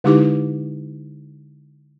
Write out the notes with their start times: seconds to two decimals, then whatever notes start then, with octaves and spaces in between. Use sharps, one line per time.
0.04 D3 G#3 D#4 E4 G4 D6